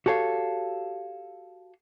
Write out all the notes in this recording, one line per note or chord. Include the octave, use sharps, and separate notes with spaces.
F#4 G4 A4 C#5 F5